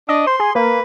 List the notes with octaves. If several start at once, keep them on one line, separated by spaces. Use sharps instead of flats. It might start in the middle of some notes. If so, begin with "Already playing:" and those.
D4 D#5
C5 C6
G#4
A#3 B4